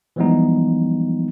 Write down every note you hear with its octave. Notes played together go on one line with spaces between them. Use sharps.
E3 F3 G3 G#3 B3 D#4